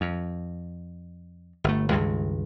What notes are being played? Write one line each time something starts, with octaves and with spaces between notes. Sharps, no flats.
F2
G1 A3
C#2 G2 D#3 G#3